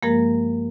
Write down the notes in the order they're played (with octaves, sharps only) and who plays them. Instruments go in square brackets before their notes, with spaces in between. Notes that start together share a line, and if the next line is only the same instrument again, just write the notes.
[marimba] G2 F3 G#3 A#3 A#4